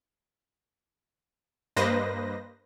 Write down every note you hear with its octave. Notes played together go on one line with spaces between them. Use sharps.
G2 A#3 B4 C5 D#5 A#6